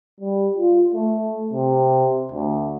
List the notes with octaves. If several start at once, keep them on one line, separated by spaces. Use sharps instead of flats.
G3
F4
A3
C3
D2